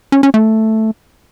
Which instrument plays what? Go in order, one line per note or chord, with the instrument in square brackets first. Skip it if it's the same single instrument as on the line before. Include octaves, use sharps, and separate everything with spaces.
[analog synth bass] C#4
C#4
A3